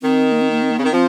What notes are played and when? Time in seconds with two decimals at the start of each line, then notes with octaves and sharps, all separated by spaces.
0.02 D#3 C4
0.32 A#3
0.41 C4
0.51 A#3
0.62 C4
0.71 A#3
0.78 C#3 C4
0.84 D#3
0.92 F3 C4